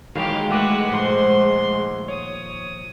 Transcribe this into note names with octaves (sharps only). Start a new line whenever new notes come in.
D#3 E3 F#3 G#3 A#3 G4 F5
A3 F#4 B4 F#5 D6
A#2 D#3 F3 C6
C#5 D#6